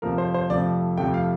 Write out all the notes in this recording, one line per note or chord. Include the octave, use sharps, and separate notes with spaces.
F2 C3 F3 A3 A#4
C5
C5
F2 C3 F3 A3 D5
F2 C3 F3 A3 G5
F5